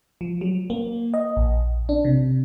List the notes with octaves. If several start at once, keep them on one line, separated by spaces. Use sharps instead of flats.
F3
F#3
A#3
D#5
A#1
D4
C3